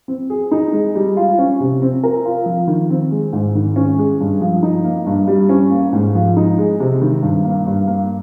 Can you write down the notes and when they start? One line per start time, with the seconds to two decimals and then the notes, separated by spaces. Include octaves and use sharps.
0.08 C4
0.30 G#4
0.51 D#4
0.73 G#3
0.95 G3
1.17 F4
1.38 C#4
1.60 C3
1.82 C4
2.04 A#4
2.25 F4
2.46 F3
2.67 D#3
2.90 C4
3.11 G#3
3.33 G#2
3.55 D#3
3.76 C#4
3.98 G#3
4.20 G2
4.41 F3
4.63 D#4
4.84 A#3
5.06 G2
5.28 G3
5.49 C#4
5.71 A#3
5.93 G#2
6.15 F3
6.37 D#4
6.58 G#3
6.80 C3
7.01 D#3
7.22 G2
7.44 A#3
7.66 G2
7.87 A#3